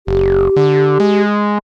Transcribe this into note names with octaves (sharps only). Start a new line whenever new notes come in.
F#1 G4
D3
G#3